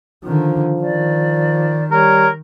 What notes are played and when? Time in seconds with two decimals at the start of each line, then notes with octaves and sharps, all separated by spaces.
0.24 D3 D#3 F3
0.81 D#3 D5
1.91 G3 A#4 C#5